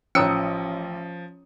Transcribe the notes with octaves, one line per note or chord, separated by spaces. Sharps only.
A1 F3 C#4 C#5 A#5 D#6 E6 C#7